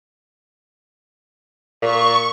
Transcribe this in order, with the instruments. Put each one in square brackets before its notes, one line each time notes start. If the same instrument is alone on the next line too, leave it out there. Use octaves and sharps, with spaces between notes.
[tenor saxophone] A#2 [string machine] C#6